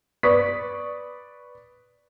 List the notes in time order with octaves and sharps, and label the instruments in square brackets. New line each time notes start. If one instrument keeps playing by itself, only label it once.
[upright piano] B4 D5 C#6 D#6 B6